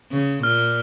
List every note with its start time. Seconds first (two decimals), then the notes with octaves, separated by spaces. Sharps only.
0.12 C#3
0.43 A#2 F6